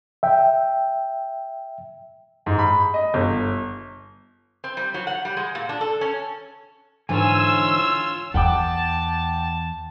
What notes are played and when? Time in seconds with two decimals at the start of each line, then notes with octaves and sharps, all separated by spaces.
0.23 E5 G5
2.46 G#2
2.59 B5
2.94 D#5
3.14 G1
4.64 C4
4.77 G3
4.94 F#3
5.07 F#5
5.25 G3
5.37 G#3
5.55 A#2
5.69 D4
5.81 A4
6.01 C#4
7.09 G#2 D3 E3 F4 C#5 G#5 E6
8.34 E2 F#5 G5 A5 D6